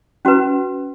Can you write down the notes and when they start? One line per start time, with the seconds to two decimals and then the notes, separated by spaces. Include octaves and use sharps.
0.25 C#4 F#4 B4